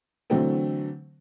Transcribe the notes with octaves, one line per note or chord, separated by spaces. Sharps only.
D3 E3 F#3 A3 C4 D4